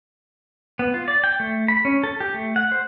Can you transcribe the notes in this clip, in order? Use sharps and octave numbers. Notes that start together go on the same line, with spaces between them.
B3
F4
D5
G5
A3
B5
C#4
A4
G4
A3
F#5
C5